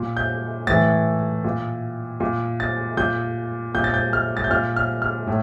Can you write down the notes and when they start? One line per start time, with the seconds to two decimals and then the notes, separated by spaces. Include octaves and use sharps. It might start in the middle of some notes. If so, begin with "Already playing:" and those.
Already playing: A#2
0.17 G6
0.67 A2 E3 A6
1.44 A#2
2.20 A#2
2.60 A6
2.97 A#2 G6
3.75 A#2 G6
3.84 A6
3.94 G6
4.13 F6
4.37 A6
4.44 G6
4.51 A#2 F6
4.76 F6
5.02 F6
5.27 A2